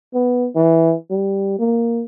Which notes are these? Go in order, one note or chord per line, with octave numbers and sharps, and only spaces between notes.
B3
E3
G3
A#3